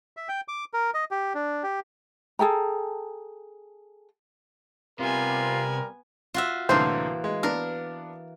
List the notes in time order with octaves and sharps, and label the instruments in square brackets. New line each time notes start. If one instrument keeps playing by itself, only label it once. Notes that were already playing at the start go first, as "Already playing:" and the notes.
[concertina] E5
G5
D6
A#4
D#5
G4
D4
G4
[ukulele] G#4 A4 G5 A#5
[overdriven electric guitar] C3 [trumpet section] G3 A#4 [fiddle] B3 G#5 [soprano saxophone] F4
[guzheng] F4 F#4 E5
[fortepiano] C2 A2 D3 [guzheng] E3 A#3 [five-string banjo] C5
[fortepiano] G#3
[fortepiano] B3 D4 F6 [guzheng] A#4